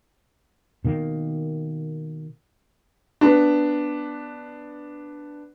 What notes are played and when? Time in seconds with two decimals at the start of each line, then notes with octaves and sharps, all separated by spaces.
0.85 B2 D#3 A#3
3.21 B3 D4